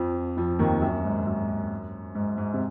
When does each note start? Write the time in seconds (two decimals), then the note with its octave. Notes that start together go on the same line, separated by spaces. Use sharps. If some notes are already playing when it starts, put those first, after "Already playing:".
Already playing: F2 F3
0.37 F2 F3
0.59 D#2 D#3
0.81 F#2
1.04 G#2
1.26 F#2
2.15 G#2
2.37 G#2
2.54 C3